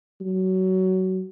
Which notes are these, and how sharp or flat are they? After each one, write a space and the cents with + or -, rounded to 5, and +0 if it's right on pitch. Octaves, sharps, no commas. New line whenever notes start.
F#3 +20